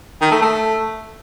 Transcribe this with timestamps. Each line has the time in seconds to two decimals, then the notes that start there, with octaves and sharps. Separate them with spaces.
0.21 D#3
0.31 A3
0.41 A3